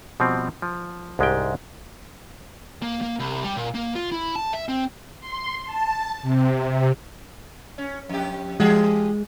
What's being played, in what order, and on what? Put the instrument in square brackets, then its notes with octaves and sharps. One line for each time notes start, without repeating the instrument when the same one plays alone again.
[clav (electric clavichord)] B2 F3 G3 C4
F3
C2 G#2 G#3 D4 G4 G5
[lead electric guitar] A#3
A#3
C2
G3
A#2
A#3
F4
E4
A5
E5
C4
[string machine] C6
A5
C3
[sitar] C#4
F2 G4
[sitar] E3 G4 G#4 [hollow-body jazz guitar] G#3